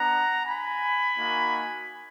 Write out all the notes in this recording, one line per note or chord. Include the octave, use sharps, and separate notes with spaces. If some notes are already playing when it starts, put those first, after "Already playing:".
Already playing: B3 D4 F#5 A#5
G#5 B5
A#3 D#4 F#4